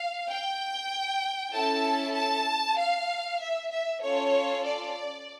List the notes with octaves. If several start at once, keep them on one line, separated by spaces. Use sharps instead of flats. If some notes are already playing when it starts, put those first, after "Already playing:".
Already playing: F5
G5
C#4 E4 A4 A5
A5
F5
E5
E5
C#4 F4 A4 C#5
D5